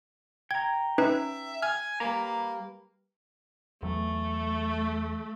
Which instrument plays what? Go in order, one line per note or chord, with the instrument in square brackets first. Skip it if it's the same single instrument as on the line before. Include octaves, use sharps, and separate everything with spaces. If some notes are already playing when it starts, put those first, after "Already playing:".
[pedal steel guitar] G5 A#5 [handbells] G#6
[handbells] C#4 D#4 B4 [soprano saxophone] E5
[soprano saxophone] G#5 [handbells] F6
[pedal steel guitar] G3 B4 A#5 [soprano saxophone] A#3
[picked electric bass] E2 F#3 [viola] A3